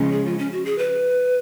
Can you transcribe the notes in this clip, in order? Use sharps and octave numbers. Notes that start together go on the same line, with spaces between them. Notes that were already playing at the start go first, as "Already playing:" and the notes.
Already playing: C#3 F3 G#3 C#4
G#4
F4
C#4
F#4
G#4
B4